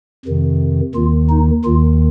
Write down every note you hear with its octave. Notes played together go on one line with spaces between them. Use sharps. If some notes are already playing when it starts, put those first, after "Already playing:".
F2 C3 D#3
D#2 D#3 F4
D#4
D#2 D#3 F4